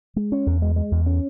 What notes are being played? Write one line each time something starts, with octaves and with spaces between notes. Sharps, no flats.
G#3
C#4
E2
G#3
G#3
E2
C#4